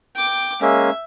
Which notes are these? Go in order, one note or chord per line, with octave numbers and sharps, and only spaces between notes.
G5 D6
G#3 A#3 C#4 E5